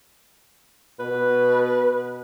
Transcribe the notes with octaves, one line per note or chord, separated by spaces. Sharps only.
B2 B4